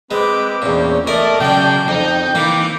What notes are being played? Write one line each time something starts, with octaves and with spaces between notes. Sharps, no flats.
G#3 C4 B4 D6
E2 A#2 C#4
A3 A#4 D5 D#5 G#5 A5
C#3 F#3 C#4 G5
F2 D#4
E3 A#3 D6